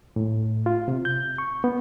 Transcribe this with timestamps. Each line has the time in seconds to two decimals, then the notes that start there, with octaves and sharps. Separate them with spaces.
0.16 A2
0.66 F4
0.88 C3
1.05 G6
1.38 C#6
1.64 B3